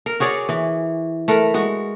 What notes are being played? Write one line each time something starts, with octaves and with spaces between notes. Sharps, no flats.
A#4
F#4 G#4 C#5 D5
E3
A3 A#4 B4
G#3 F#4